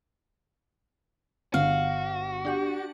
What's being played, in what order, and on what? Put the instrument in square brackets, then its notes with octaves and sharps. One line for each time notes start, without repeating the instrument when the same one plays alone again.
[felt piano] G1 [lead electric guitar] F#4 [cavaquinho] F5
[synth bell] D4 G4 F#5